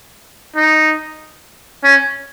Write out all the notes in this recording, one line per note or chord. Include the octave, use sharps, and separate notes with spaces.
D#4
C#4